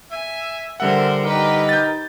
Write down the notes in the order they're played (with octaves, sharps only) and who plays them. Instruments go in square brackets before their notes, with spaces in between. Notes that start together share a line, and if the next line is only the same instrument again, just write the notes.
[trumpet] E5 [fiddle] G#5
[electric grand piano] D3 G3 F#5 [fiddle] A#4 C5 [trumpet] E5
[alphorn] D#4 [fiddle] G4 B4 [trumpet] A#4
[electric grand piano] G6 A6